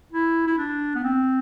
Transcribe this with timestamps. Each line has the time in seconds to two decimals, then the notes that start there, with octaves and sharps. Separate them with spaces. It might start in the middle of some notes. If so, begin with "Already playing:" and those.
0.12 E4
0.47 E4
0.58 D4
0.95 B3
1.04 C4